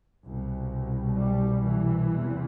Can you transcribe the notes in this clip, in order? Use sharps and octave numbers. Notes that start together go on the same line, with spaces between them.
C2 B2
G3
E3
E2 C3